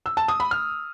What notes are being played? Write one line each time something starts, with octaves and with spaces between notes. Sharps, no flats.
E6
A5
D#6
B5
F6